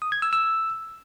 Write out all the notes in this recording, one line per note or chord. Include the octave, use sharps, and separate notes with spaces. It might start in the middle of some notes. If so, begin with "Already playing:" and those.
D#6
G#6
E6
E6